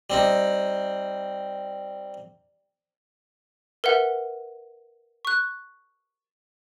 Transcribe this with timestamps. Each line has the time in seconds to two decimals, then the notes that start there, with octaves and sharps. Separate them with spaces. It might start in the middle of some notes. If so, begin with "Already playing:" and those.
0.10 G3 C4 D#4
3.84 A#4 B4 E5 F#5
5.25 C#6 F#6